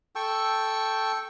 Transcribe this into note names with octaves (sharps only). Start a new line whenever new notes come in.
A4 G5 C#6 E6